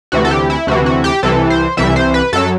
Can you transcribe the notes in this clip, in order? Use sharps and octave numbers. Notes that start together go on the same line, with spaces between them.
D2 C3 E3 F#4
A4
G4
E4
D2 C3 E3 F#4
F#4
G4
C2 C3 E3 A4
C5
C2 C3 E3 E5
C5
B4
F#2 F#3 A4